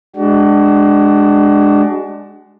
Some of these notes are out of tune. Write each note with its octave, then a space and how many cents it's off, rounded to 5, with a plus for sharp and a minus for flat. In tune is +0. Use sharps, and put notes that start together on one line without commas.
G#3 +0 D4 +10 F#4 +35